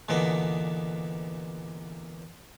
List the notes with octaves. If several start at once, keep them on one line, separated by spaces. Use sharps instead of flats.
E2 A#2 D3 B3 D#5